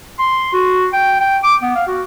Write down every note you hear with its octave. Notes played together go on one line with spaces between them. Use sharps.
C6
F#4
G5
G5
D6
B3
F5
F#4